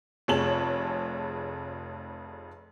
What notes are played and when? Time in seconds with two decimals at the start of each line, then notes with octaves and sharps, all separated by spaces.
0.28 F1 F2 G#4 C#5 A5 F#7